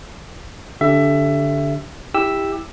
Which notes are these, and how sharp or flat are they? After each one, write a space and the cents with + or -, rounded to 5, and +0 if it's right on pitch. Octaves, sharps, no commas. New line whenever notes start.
D3 -20 G4 +0 E5 +20
E4 -15 G4 +15 E6 +0